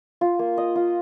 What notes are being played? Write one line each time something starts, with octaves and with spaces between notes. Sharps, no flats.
F4
A#3
D#5
F4